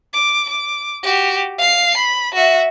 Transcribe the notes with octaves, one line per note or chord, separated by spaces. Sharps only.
D6
D6
F#4 G4
F5 C7
B5
F#4 E5